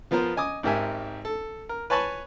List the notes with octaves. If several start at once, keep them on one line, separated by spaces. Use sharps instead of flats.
F3 B3 F4 A#4 C5
D#5 G#5 D6 D#6
G#1 G#2 G4 A#4 E5 G#5
A4
A#4
B4 C#5 G#5 A5 B5 C#6